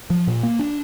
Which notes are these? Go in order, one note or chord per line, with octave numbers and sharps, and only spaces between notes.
F3
A#2
A#3
D4